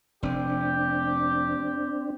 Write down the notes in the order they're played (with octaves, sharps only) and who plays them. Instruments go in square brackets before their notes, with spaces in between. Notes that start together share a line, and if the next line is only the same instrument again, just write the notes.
[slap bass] F1 [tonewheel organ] C4 D4 [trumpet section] G4